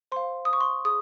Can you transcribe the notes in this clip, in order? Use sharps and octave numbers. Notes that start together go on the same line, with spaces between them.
C5 F5 C6
D#6
C#6
C6
G#4 D#6